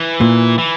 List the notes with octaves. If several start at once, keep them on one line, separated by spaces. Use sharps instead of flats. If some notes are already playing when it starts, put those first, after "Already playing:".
Already playing: E3
A#2
E3